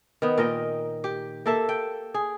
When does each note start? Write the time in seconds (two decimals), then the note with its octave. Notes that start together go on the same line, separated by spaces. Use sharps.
0.22 D#3 B3
0.38 A#2 A#4 D#5 G5
1.04 G4
1.46 A#3 A4 E5
1.69 G5
2.14 G#4